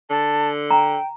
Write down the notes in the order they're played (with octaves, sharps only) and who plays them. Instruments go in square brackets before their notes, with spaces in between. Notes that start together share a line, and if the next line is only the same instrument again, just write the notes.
[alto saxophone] D3 [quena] A5
[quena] G5 [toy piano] A#5